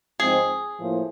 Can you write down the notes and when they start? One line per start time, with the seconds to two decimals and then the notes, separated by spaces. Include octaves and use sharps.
0.19 G#2 F3 G#3 C4 G#4
0.78 A2 F3 A#3